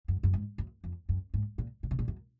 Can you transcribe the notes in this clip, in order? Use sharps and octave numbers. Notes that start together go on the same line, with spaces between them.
F#2
F#2
G#2
F#2
F2
F#2
G#2
A#2
A#2
C3
A#2
F#2